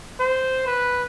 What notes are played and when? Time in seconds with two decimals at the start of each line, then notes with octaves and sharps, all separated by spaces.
0.20 C5
0.67 B4